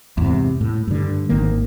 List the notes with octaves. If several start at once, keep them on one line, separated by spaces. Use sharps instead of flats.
E2 G#2 C3
A2
G2 D3
G#1 D#3 A#3